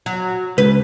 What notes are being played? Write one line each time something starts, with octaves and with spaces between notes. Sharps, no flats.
F#3
C#2 B4